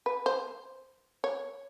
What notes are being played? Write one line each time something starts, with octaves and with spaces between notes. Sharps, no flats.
B4
C5
C#5